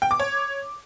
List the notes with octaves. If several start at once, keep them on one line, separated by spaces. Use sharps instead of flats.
G5
D6
C#5